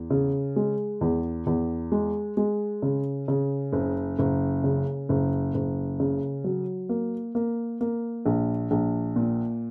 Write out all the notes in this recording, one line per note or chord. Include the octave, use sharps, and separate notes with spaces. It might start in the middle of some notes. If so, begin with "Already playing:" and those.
Already playing: E2
C#3
G#3
E2
E2
G#3
G#3
C#3
C#3
F#1
F#1
C#3
F#1
F#1
C#3
F#3
A#3
A#3
A#3
A#1
A#1
A#2